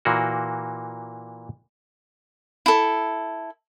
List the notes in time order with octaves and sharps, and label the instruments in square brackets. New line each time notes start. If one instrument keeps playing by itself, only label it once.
[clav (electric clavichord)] A#2 E3 A#3 F#4
[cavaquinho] E4 A4